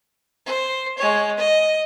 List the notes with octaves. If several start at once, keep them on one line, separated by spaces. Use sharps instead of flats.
C5
G#3 C#5
D#5